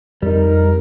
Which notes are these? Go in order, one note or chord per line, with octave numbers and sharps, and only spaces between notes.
F2 G3 D#4 A#4